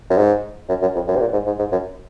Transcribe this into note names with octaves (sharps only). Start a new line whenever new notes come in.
F#2
G#2
F#2
F#2
F2
F#2
C3
A#2
G#2
G#2
G#2
F#2